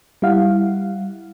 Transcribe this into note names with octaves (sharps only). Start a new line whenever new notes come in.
G3 E4 F5 F#5